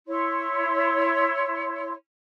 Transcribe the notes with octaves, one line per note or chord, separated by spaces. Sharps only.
E4 C#5 C6